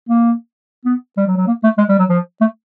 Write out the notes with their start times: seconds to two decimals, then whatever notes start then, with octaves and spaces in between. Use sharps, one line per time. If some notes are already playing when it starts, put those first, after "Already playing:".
0.09 A#3
0.85 B3
1.17 G3
1.27 F#3
1.37 F#3
1.47 A#3
1.63 A3
1.78 G#3
1.89 G3
1.98 F#3
2.09 F3
2.41 A3